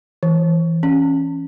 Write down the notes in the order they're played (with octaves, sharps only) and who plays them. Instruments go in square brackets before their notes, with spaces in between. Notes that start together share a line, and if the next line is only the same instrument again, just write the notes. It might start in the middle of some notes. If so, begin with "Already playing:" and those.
[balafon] E3
C#4